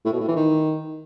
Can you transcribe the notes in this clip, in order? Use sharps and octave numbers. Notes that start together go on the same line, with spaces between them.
A2
B2
A2
E3
D#3